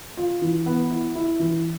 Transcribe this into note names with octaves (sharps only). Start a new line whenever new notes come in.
F4
E3
B3
E4
E4
E3